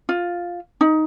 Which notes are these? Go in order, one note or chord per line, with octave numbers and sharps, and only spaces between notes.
F4
D#4